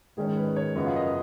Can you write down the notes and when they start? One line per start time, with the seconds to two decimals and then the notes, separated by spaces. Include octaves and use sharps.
0.17 G#2 D#3 G#3 C#4 G#4
0.36 B4
0.56 C#5
0.75 F#2 C#3 F3 B3 D#5
0.87 F5
0.96 D#5